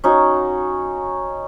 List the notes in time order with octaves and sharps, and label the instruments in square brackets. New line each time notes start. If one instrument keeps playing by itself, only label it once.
[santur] C#4 D#4 F#4